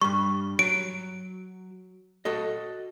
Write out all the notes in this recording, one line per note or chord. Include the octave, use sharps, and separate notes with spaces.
G2 G3 C#6
F#3 D7
F#4 A4 D#5